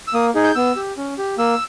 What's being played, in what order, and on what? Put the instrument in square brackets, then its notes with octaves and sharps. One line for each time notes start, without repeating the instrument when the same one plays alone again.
[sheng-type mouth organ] E6
A#3 D#6
D#4 G#4
G6
B3 E6
G4
C#4
G4
A#3 E6